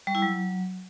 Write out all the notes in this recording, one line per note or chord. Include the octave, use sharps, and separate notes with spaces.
G3
E4
F#3